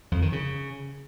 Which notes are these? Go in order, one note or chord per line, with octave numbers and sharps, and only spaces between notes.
F2
D#3
C#3